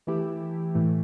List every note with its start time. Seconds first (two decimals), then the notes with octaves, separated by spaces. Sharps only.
0.07 E3 A3 E4 G4
0.75 A2 E3 A3